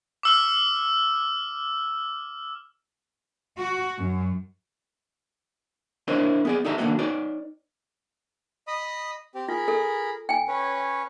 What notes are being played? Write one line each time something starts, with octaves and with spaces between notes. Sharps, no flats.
D6 E6 F6
F#4
F#2
D4 E4 A#4 C5 C#5 D#5
B3 G#4 D5
D#4 G4 A4 E5 A#5
D#3 A3 A#3 D4 F#4 A4
D#4 B4 C#5 D5
D#5 B5 D#6
C4 G4
F4 G#4 A#4 B5
A4
G5 G#5
C#4 B4 C#5